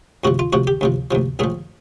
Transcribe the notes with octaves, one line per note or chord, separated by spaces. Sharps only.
D2 C3 F3 F#4
F4
D2 C3 F3 F#4
G4
D2 C3 F3
D2 C3 F3
B1 A2 F3 G#4